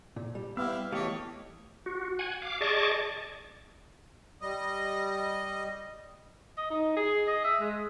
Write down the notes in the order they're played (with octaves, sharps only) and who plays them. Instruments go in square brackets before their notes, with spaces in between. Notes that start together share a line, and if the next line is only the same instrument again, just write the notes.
[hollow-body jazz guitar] A#2
G3
[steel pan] B3 [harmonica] E4 G4 F5 [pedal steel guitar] E6
[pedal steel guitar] E3 A3 [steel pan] G4 [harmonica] C#5 D#5 [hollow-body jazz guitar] F5
[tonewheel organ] F#4
F#5 G#5
F5 D6
G#4 D5 D#5 A5 C#6 D6
[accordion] G3 D#5
[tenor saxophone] D#5
D#4
G#4
D#5
E5
G#3